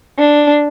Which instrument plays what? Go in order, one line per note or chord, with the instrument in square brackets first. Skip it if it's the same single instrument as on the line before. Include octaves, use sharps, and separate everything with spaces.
[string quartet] D4